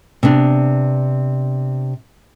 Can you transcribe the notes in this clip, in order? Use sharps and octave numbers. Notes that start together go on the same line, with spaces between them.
C3 B3 D4